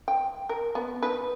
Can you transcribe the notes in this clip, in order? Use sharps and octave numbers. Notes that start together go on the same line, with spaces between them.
G5
A#4
B3
D#4 B4